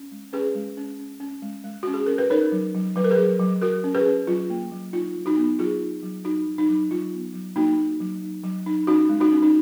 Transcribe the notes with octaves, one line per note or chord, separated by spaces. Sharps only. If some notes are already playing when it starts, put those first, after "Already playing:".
Already playing: C#4
G#3
C#4 G#4 B4
G#3
C#4
C#4
C#4
G#3
G#3
C#4 F#4
G#4
C#4 A#4
B4
D#4 A#4 C#5
F#3
F#3
F#3 B4
A#4
G#4 B4
F#3
F#3
F#3 F#4 A#4
C#4
G#4 B4
C#4
F#3 F4
A#3
F#3
D#4 F4
F#3
D#4 F#4
B3
F#3 F4 G#4
D#4
F#3
D#4 F#4
F#3
D#4
F#3
F#3 F4
B3
F#3
A#3 D#4 F#4
D#4
F#3
D#4
F#3
D#4
C#4 D#4 F#4
G#3
D#4 F#4
C#4
D#4